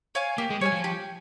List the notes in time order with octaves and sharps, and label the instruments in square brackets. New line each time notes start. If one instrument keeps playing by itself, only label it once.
[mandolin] C#5 F5 G#5
[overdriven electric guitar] A#3 [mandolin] G4
[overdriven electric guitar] G#3
[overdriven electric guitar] G3 [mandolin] C#5 F5 G#5
[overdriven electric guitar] F3
[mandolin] G4